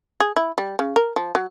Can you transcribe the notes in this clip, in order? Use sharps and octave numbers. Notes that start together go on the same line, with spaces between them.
G#4
E4
G3
C#3
A#4
F3
F#3